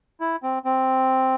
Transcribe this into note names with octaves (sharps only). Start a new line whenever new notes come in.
E4
C4
C4